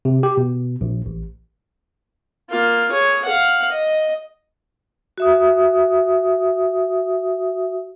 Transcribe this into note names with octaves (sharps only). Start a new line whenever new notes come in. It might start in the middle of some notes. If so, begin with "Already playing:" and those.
C3
G4
B2
A#1
A1
A#3 F4
G#4 C#5
F5 F#5
D#5
F#4 E5 D#6